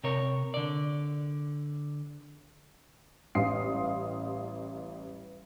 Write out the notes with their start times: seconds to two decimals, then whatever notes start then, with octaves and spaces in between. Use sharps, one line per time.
0.04 C3 A#4 C#5
0.54 D3 D5
3.35 A1 G3 F5 C6 D#6 C7